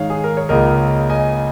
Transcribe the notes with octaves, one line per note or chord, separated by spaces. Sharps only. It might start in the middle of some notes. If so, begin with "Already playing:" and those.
Already playing: G#2 D#3 G#3 D#4 C#5 F5
G#4
A#4
C#5
C#2 C#3 A#3 C#4 F4 A#4 D#5
D#5 G#5